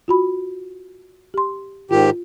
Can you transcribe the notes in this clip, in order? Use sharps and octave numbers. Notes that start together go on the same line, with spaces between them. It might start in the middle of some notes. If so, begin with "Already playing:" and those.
F4 F#4 B5
G4 C6
G#2 D#3 F4 G4